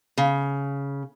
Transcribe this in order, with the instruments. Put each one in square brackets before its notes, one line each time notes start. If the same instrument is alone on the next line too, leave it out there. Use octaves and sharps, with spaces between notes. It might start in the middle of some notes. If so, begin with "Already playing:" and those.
[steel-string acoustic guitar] C#3